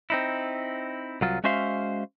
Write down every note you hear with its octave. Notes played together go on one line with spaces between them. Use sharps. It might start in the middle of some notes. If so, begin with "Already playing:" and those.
C4 D#4 E4
C2 F#3 F4
G#3 C#4 F#4 C5 E5 F5